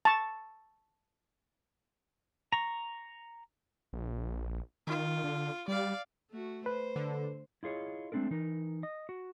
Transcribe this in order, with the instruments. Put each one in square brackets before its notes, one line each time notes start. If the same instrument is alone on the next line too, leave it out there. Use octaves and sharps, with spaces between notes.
[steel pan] A5 C#6
[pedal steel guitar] A#5 C#6
[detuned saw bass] A#1
[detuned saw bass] D#3 [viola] F4
[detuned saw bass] D3
[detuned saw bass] G3 [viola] D5 F5
[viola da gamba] A3 F#4
[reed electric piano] B4 [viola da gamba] C5
[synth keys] D3
[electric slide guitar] E4 F4 G#4 C#5 D#5
G#3 A3 C4 D4 A4 A#4
E3 D#4 A#4
D#5
F#4